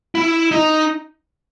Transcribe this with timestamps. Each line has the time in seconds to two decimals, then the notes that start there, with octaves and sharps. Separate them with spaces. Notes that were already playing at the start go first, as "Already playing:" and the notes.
0.15 E4
0.51 D#4